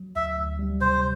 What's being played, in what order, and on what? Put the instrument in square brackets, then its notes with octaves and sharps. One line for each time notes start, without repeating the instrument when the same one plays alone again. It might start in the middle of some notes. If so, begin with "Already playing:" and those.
Already playing: [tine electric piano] F#3
[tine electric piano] D2 [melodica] E5
[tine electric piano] D2
G3
[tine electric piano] C3 [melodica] C5